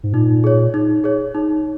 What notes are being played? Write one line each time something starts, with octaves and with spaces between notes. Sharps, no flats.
G#2
A#2 D#4
G#4 C#5
D#4
G#4 C#5
D#4